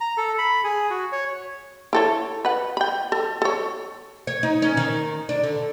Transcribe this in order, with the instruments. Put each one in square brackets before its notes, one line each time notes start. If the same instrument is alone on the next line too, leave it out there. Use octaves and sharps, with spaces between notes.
[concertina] A#5
A4
B5
G#4
F#4
C#5
[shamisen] E4 A4 C#5
B4 F#5
G5 B5
A4
A4 C#5
[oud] C#5
D#4
C#4
D#3
D4
D3